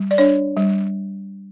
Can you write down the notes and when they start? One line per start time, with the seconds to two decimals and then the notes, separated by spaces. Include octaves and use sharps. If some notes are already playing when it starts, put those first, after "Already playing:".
Already playing: G3
0.11 D5
0.18 D4 C#5
0.57 G3